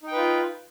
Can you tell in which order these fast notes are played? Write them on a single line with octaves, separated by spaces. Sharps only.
D#4 G5 B4 F4